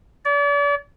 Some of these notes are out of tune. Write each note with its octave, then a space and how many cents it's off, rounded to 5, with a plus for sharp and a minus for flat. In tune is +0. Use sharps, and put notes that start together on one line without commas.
D5 -40